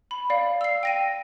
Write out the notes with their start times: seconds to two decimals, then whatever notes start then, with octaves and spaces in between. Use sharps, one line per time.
0.11 B5
0.30 D5 F5
0.61 E6 C7
0.83 G5 A#6 D#7